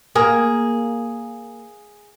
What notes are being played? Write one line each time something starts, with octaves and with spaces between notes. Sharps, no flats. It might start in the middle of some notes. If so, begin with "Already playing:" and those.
A#3 G#4